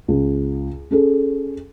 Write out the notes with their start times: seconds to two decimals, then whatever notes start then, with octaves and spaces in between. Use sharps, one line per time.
0.08 C#2
0.91 C#4 G#4 A4